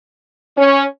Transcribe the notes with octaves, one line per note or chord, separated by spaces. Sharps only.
C#4